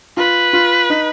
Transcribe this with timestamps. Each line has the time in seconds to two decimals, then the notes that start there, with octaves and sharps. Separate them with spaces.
0.17 F4 B4
0.53 F4
0.90 D#4